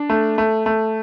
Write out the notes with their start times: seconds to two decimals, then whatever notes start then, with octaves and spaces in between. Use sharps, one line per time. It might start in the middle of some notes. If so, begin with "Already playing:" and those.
Already playing: D4
0.10 A3
0.38 A3
0.66 A3